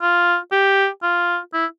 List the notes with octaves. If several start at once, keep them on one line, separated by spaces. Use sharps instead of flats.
F4
G4
F4
E4